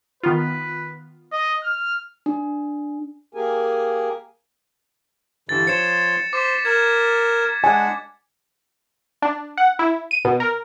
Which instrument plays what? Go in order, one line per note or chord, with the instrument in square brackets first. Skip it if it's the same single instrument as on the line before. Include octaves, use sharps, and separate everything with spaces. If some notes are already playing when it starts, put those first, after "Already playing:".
[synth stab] D#3 B3 F4 [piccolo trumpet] B4
[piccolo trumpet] D#5
F6
[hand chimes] D4
[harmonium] A#3 G4 G#4 A#4 G#5
[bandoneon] G2 D3 E3 [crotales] A6
[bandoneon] F3 C5 C#5 [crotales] C#7 E7
[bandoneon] C5 [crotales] D6 B6
[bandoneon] A#4 [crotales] G#6
[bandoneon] G#3 D4 F#5 [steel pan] G#5
[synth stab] D4
F#5
E4
D#7
B2
A#4